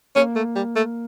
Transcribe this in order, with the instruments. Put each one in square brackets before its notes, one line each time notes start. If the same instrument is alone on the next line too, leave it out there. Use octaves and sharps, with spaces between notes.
[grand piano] A#3 [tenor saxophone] C#4
[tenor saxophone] A3
G3
A3